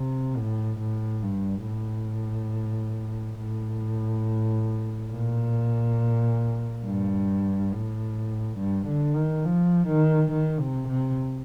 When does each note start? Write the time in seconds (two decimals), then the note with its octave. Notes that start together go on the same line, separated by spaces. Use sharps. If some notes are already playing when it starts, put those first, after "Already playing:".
Already playing: C3
0.36 A2
0.79 A2
1.22 G2
1.66 A2
3.39 A2
5.11 A#2
6.85 G2
7.72 A2
8.58 G2
8.87 D3
9.16 D#3
9.45 F3
9.87 D#3
10.31 D#3
10.59 C3
10.88 C3